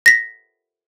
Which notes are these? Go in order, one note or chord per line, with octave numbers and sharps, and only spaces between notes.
A#6 B6